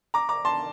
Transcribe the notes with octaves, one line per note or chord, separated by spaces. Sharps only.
A#5 D6
A#5 D6
A5 C6